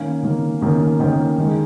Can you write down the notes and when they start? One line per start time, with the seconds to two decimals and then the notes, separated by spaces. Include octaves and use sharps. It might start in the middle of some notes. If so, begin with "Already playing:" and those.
Already playing: D#3 A#3 C#4 C#5 F5
0.23 D#3 A#3 C#4
0.61 D#3 A#3 C#4
0.99 D#3 A#3 C#4 D#5 G5
1.38 D#3 G#3 D#4